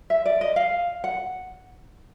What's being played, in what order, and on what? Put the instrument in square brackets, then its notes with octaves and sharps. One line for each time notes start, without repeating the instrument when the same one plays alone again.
[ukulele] E5
D5
D#5
F5
F#5